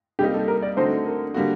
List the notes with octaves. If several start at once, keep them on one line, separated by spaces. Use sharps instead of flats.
C3 G3 A#3 D#4 G4
A4
A#4
D5
D3 A3 C4 D#4 F#4 C5
A#4
D3 G3 A#3 F#4